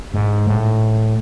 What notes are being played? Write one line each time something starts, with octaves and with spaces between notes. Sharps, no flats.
G#2
A2